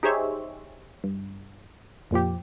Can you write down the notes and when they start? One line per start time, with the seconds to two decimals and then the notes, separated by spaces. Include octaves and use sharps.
0.03 D#4 G4 G#4 C5 C#5 E5
1.04 G2
2.11 F2 A#2 F3 G4